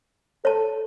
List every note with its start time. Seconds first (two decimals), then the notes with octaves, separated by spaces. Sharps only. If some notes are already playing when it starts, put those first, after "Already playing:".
0.45 A4 C#5 A5